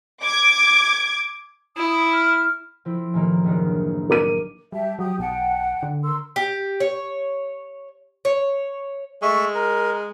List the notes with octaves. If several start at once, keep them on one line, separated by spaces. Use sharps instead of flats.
D6 G#6
E4 D#6
F6
F3 C4 E4
A1 D#3 A#3
F#1 D#3 D4
A#4 D6 D#7
G3 G4 E5 A5
F#3 G4 D#6
B1 F#5 G5 A5
D3
A#4 C6 E6
G4
C#5
C#5
G#3 A3 E5 C#6
A#4